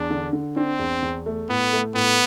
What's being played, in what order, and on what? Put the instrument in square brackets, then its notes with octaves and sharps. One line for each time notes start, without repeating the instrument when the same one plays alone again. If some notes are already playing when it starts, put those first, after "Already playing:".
Already playing: [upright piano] E2 [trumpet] D4
[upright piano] D3
D3
[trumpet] C4 [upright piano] D4
[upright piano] E2
E2
A3
[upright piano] A2 [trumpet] B3
[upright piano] A3
[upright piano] A2 [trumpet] B3